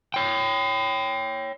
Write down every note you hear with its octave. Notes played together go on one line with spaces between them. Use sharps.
C#5 G5